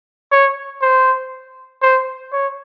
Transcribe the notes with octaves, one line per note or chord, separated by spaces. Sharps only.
C#5
C5
C5
C#5